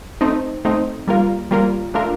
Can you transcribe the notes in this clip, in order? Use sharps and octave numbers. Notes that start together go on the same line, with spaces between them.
A3 C4 D#4
A3 C4 D#4
G3 A#3 F4 A#4
G3 A#3 F4 A#4
A3 D4 F4 A#4